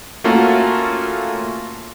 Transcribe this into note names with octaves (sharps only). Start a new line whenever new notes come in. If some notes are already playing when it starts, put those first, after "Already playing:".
A3 A#3 C#4 F4 F#4 A4